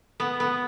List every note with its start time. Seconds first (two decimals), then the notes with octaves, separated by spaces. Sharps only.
0.20 B3
0.40 B3